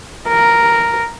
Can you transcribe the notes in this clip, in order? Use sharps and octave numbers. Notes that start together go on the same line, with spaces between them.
A#4